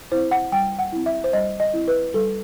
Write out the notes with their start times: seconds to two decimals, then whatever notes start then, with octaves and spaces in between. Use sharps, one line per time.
0.11 C4 E4 C5
0.31 F#5
0.52 G3 G5
0.79 F#5
0.92 C4 E4
1.06 E5
1.24 C5
1.33 G3 D#5
1.60 D#5
1.74 C4 E4
1.88 B4
2.14 G3 A4